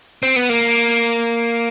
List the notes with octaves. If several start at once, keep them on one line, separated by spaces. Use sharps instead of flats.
C4
B3
A#3